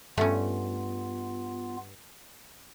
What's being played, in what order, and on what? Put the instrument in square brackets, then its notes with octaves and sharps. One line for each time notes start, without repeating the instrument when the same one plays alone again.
[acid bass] G2 [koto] A3 C#4 [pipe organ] B3 F4